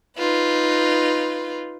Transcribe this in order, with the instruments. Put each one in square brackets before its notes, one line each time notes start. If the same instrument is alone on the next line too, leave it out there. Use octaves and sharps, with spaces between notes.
[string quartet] D#4 F4 B4